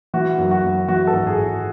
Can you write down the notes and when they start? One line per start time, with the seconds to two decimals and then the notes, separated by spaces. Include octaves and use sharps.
0.14 E3 F#4
0.38 F#2
0.51 F#4
0.64 F#2
0.88 E3 F#4
1.07 A4
1.13 G#1
1.27 G#4
1.39 G#1